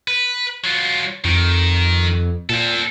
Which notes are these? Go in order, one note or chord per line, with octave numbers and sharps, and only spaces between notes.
B4
F#3 F4
F2 D#3
A#2 C4 A4